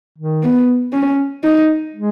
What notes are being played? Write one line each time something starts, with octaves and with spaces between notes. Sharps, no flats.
D#3
B3
C#4
D#4
G#3